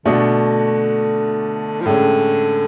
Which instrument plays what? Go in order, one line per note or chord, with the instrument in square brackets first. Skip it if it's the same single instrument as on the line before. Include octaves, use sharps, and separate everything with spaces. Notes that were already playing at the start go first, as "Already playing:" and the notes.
[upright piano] B2 A3 D4 F#4 [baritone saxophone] D3
[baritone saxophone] F3
[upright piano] A2 G#3 C#4 [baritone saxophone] D3